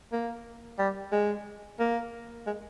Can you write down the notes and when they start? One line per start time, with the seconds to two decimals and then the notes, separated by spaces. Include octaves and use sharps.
0.12 A#3
0.79 G3
1.12 G#3
1.79 A#3
2.47 G#3